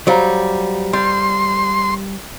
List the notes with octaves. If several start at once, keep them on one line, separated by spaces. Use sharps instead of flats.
F#3 G3 C5 F5 A#5
G3 C6